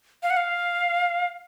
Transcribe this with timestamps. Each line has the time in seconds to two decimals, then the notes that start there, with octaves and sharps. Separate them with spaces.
0.23 F5
0.30 F#5
0.37 F5